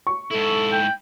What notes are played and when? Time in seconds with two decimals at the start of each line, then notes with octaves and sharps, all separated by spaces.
0.07 C#6
0.31 G#2 E4 A4
0.72 G5